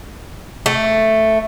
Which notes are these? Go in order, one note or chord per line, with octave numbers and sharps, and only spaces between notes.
A3